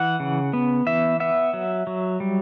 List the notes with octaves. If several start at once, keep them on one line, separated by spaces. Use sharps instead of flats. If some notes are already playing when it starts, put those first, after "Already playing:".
Already playing: E3 F#5
C#3
B3
E3 E5
B3 E5
F#3
F#3
G3